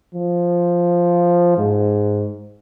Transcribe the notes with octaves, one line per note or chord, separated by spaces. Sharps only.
F3
G#2